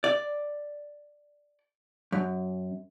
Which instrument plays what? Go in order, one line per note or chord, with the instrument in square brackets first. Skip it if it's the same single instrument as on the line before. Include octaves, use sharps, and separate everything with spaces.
[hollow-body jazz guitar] D5
F#2